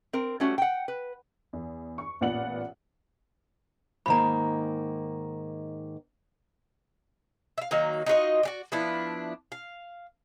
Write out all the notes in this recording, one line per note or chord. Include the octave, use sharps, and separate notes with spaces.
C4 A#4
G3 A3 C#4 F#4
F#5 G5
B4
E2
C#6
A1 A#2 B3 D5 F#5 F#7
G#2 D#3 A#3 A#5 B5
E5 F5
D#3 F#3 A#3 D#4
D#4 F4 F#4 D#5
F#4 G4 D5
F3 B3 D4 E4
F5